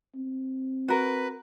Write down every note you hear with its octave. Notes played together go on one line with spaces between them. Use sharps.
C4
F#4 A#4 B4